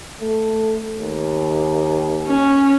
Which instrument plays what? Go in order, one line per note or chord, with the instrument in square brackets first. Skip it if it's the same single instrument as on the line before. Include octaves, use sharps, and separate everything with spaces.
[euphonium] A3
D#2
[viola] C#4